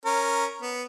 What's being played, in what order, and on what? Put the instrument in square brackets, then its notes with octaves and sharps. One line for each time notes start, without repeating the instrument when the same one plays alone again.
[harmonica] C#4 A#4
B3